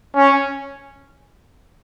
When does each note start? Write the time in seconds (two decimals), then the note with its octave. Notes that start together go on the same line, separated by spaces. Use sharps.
0.16 C#4